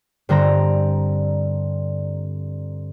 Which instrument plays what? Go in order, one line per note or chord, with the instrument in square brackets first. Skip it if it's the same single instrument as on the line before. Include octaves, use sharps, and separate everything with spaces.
[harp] G2 D3 C4 A#5